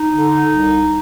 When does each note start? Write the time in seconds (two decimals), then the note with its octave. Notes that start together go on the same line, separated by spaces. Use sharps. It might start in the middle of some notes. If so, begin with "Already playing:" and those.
Already playing: D#4
0.10 D3
0.50 C2